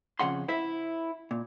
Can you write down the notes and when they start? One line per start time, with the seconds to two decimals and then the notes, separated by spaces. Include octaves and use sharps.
0.19 F2 C#3 F#5 C6
0.48 E4 C5 E5
1.31 A#2